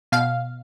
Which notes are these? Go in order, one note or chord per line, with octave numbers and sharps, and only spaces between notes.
B2 F5